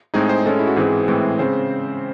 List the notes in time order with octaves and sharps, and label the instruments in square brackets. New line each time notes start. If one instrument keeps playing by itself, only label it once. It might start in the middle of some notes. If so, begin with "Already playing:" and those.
[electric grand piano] A2 G#3 C4 D#4 G#4
C5
A2 G#3 C#4 A4
E4
F#4
G#2 E3 C4 G#4
A2 E3 G#3 C4
C#3 G#3 C4 C5